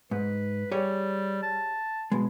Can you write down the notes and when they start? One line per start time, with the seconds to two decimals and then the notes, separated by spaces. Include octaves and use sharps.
0.11 G#2 B4
0.71 G3 G4 G#4 C#5
1.43 A5
2.12 B2 G#3